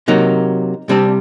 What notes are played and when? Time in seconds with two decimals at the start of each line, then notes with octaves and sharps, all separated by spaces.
0.08 C3 F#3 A#3 D#4
0.89 C3 G3 C4 D4